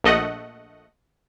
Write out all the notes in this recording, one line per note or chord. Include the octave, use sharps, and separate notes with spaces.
A#1 A3 D#5 F#5